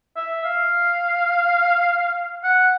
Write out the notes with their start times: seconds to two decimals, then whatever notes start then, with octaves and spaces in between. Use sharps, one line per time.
0.16 E5
0.45 F5
2.43 F#5